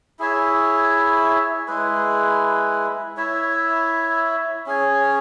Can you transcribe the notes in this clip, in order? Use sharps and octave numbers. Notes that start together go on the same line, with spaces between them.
E4 G#4 C#5 E5
G#3 E4 G#4 B4
E4 C#5 E5
C#4 G#4 C#5